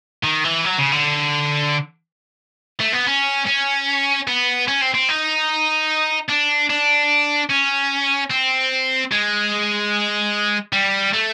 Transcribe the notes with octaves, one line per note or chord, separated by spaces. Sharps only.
D#3
E3
F#3
C#3
D3
A3
B3
C#4
C#4
B3
C#4
C4
C4
D#4
D4
D4
C#4
C4
G#3
G3
A3